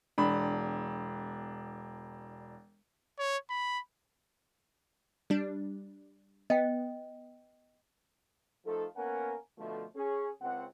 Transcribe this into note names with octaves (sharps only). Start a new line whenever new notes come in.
E1 D4 B5
C#5
B5
G3 D4
B3 D#5 G5
F3 A3 D#4 F4 A4
A#3 B3 C#4 A#4 F#5 G#5
B2 D3 F3 A3
C#4 G#4
C#2 C4 F#5